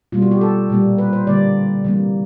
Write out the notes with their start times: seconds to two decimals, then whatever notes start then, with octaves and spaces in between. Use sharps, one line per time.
0.12 B2 G3 A#3 F4
0.22 F#4
0.31 G4
0.41 A4
0.70 A#2 G3 A#3
0.98 B4
1.13 C5
1.27 D3 G3 A#3 D5
1.85 C3 E3 G3 A#3